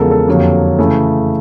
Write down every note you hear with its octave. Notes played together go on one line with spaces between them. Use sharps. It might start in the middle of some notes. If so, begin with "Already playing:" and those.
Already playing: E2 C#3 F3 G#3 A4 A#4
A4
F2 D3 F#3 A#3 G4
C#3 E3 A3